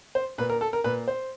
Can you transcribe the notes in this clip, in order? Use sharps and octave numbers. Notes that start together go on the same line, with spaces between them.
C5
A#2 B4
A#4
A4
A#4
A#2 B4
C5